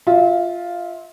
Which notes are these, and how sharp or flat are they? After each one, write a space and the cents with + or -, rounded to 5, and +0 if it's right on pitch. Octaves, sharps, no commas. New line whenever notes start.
F4 +0 E5 -30